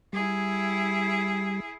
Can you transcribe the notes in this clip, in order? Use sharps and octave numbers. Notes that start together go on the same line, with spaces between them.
G3 E4 G#4